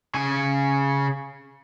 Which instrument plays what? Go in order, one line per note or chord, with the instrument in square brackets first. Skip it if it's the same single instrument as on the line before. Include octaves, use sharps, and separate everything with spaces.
[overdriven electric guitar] C#3 G#5